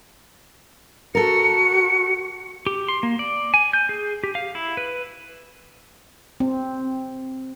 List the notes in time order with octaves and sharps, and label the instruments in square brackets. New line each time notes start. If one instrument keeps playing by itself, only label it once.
[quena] F#4 [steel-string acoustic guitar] A4 A#4 [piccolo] C#7
[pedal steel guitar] G4
C6
A#3
D5
G#5
G6
G#4
G4
F5
E4
B4
[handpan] C4